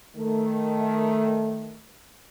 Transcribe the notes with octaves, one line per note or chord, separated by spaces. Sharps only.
D#3 A3